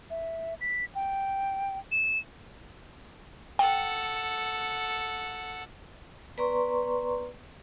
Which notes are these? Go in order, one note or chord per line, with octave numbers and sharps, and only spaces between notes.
E5
B6
G5
E7
A4 F#5 G5
B3 B4 D5 A#5 C6 C#6